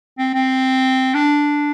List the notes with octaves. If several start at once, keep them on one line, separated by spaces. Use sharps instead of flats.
C4
C4
D4